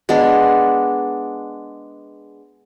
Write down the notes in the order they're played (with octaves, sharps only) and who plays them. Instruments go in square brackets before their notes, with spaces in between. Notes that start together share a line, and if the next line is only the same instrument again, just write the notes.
[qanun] G#3 B3 D4